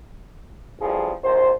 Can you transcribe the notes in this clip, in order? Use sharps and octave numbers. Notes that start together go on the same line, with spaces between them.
A1 F2 F3 G3 G#4
A#1 D#2 C5